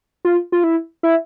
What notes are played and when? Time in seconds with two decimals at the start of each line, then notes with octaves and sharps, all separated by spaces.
0.25 F4
0.52 F4
0.64 E4
1.03 E4